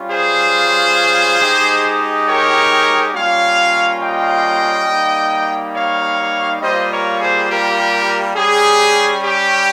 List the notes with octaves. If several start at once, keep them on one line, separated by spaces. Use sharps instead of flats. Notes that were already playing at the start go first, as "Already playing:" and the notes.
Already playing: G3 C#4 F4
G#4 C5
G#3 D#4 G4
A#4 C#5
G3 A#3 C#4 F4 C#5 F5
D#5 G5
G3 A#3 D#4
C#5 F5
G3 A#3 F4 C5 D#5
A#4 C#5
G#4 C5
G4 A#4
G3 C#4 G4 G#4
G4